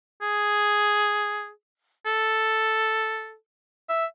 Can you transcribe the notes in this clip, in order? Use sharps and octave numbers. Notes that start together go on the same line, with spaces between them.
G#4
A4
E5